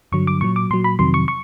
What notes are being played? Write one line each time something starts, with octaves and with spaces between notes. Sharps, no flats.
G2 D3 F#3 C#6
D6
A#2 F#3 C#6
D6
A#2 F#3 C6
B5
F2 C3 D#3 F#3 C6
C#6
C#6